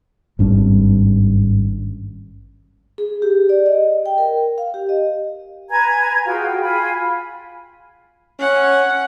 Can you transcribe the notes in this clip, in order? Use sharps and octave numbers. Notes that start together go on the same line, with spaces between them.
G#1 G2 C#4
G#4
G4
D5
D#5
G5
A#4
F5
G4
D#5
B4 G#5 A#5 G#6
F4 F#4 G#4 G5
F4 G#5 B5
C#4 F#5